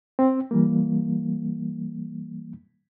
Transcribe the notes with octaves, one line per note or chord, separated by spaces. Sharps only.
C4
E3 G3 A#3